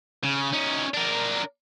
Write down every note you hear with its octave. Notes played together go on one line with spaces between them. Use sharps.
C#3
C#4 D#4
D4 A#4